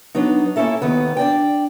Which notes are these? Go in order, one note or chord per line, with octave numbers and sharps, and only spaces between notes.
F#3 B3 D4 D#4
A#3 C#4 E4 A4 E5
D#2 D#3 B3
D4 D5 G5